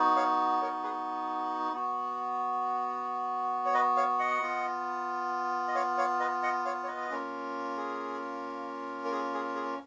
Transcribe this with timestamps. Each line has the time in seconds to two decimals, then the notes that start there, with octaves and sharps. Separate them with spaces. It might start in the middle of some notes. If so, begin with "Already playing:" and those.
Already playing: B3 D#4 F#4
0.16 C#5 F5
0.61 A#4 C#5
0.83 G#4 B4
1.73 B3 F#4
3.65 C#5
3.74 B4 D#5
3.96 C#5 F5
4.19 D#5 F#5
4.42 B3 F4
5.68 D#5
5.75 C#5 F5
5.98 C#5 F5
6.20 B4 D#5
6.43 D#5 F#5
6.65 C#5 F5
6.84 C#5
6.88 B4 D#5
7.09 A#3 C#4 F4
7.77 G#4
9.05 A#4
9.12 G#4
9.34 G#4
9.55 G#4